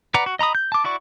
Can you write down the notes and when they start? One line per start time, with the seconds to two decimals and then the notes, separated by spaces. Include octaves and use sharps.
0.14 B4 D5 F#5 A#5
0.26 F#4
0.39 D#5 A#5 B5 D#6
0.55 G6
0.72 A5 D6
0.84 E4 F#4 D5 C#6